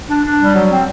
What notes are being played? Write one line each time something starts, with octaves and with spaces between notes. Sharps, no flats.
D4
D4
G3
F#3
C4